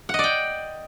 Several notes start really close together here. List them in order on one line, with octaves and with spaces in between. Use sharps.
F#5 D#5 D5 G5